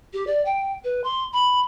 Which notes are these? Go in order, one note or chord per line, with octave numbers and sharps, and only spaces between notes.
G4
D5
G5
B4
C6
B5